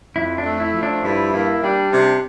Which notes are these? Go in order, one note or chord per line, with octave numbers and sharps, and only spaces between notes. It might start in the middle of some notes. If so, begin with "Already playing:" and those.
F2 E4
D4
A3
E4
F3
D4
G2 E4
A#3 E4
G3 D4
C3 D4